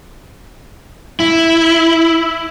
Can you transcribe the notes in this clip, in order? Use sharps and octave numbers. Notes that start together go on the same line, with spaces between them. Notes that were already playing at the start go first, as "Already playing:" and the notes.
E4